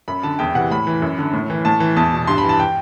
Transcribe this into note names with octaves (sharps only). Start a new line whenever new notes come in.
F#2 B5
D3 A5
E2 G5
C3 E3 F#5
A2 B5
E3
F#2
D3
A2
E3
A2 A5
E3
E2 A5
B2
G2 C6
B5
E3
A5
G5